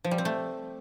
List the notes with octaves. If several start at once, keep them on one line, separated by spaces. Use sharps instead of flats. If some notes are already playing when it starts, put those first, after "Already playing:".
F3
G3
C4
A3